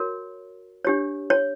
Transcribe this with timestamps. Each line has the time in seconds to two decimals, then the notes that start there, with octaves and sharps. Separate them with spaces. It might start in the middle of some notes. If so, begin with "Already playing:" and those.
Already playing: F#4 A#4 C#5
0.85 D4 G4 C#5
1.30 C#5